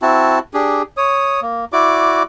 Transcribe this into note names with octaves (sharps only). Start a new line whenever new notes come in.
C4 E4 F#4 A5
D4 G4 G#4
C#5 D#6
A#3
E4 F#4 D5 D6